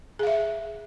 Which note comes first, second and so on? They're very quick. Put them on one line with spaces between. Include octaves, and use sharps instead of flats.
G#4 F5 E5